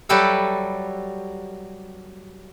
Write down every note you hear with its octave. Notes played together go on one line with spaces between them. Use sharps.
F#3 G3 G4 A4 B4 E5